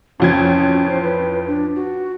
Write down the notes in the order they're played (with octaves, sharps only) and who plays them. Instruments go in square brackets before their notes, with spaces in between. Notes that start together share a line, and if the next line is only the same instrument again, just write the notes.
[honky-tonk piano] A1 F2 G#6 [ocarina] C#4
[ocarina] C5
B4
D4
F#4